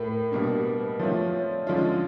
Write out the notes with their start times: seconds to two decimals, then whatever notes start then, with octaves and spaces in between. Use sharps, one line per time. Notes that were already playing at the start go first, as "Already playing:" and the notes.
Already playing: A2 A3 A4 A#4
0.31 B2 G3 A#3 D4 A#4
0.65 B4
1.00 F3 A3 C4 F4 C#5
1.33 C#5
1.50 D5
1.67 D3 F3 G#3 C#4 F4 D#5